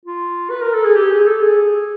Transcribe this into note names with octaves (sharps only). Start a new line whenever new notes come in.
F4
B4
A#4
A4
G#4
G4
G#4
A4
G#4